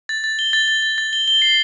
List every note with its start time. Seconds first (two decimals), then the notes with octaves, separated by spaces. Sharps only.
0.09 A6
0.24 A6
0.39 G7
0.53 A6
0.68 A6
0.82 A6
0.98 A6
1.13 G7
1.28 G7
1.42 C7